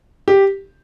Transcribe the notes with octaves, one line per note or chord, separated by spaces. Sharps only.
G4